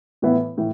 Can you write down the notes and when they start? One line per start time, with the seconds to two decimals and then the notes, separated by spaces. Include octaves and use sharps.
0.22 A2 E3 B3 E4
0.58 A2 E3